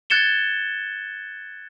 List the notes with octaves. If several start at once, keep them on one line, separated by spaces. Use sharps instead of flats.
F#6 G#6 A6 C#7 E7 G7